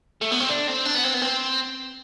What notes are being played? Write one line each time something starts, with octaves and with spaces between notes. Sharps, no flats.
A3
B3
C4
D4
C4
D4
B3
C4
B3
C4